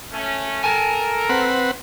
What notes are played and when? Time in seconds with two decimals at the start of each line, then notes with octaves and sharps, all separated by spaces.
0.13 A3 C#4
0.64 A4 A#4 G#5 A5
1.29 C4 B4 F#5